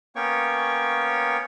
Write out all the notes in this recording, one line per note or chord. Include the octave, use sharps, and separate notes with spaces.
A#3 B3 C#4 C#5 G5 C#6